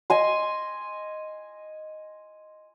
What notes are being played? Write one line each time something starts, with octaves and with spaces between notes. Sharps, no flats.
D#5 G#5 C6